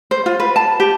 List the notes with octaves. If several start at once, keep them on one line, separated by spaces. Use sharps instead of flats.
C5
F4
B4
A5
G4